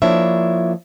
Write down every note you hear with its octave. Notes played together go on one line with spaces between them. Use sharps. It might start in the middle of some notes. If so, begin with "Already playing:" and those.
F3 A#3 D4 E4 C#5 E5